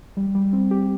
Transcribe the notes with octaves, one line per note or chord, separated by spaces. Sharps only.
G3
G3
C4
G4